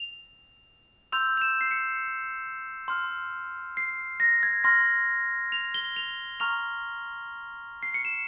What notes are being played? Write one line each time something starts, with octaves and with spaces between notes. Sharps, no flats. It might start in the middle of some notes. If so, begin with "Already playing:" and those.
Already playing: F7
C6 E6 G6 F7
F7
E7
C7
C#7
C6 F6
C7
A#6
G#6
C6 F6 A#6
F7
G7
F7
A#5 C#6 F6 F7
C7
C#7
E7